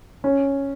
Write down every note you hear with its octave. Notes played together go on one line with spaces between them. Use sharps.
C#4